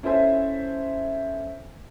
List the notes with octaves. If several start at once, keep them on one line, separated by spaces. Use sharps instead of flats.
C#4 E4 A4 C5 E5 G#5